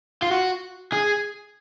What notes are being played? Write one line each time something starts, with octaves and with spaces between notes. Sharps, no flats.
F4
F#4
G#4